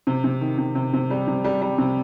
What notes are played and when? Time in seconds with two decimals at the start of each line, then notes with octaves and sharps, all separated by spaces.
0.07 C3
0.24 C3
0.41 D#3
0.58 C3
0.75 C3
0.93 C3
1.10 G3
1.27 C3
1.44 G3
1.61 G3
1.78 C3